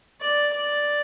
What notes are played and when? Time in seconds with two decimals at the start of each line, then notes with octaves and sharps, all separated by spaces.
0.21 D5
0.53 D5